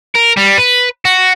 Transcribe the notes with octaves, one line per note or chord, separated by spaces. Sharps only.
A#4
G3
B4
F#4